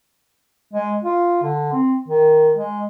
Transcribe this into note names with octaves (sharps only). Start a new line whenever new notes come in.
G#3
F4
D3
C4
D#3
G#3